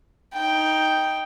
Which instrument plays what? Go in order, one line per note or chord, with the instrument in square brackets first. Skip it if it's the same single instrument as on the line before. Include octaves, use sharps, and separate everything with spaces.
[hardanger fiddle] D#4 G5